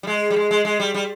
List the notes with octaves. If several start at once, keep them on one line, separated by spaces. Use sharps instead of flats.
G3
G#3
G3
G#3
G#3
G#3
G3
G3